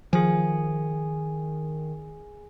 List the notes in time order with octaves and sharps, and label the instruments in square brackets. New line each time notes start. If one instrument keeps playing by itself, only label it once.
[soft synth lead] D#3 [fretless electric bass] F3 [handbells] G#4 G#5